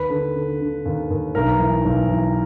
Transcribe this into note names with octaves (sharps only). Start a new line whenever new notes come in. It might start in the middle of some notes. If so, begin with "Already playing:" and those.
Already playing: D#2 B4
D3
D3
D3
D#2
D#2
B1 A#4
E3
B1
E3